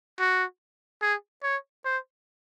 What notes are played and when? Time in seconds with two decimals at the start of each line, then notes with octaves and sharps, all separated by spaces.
0.19 F#4
1.02 G#4
1.43 C#5
1.85 C5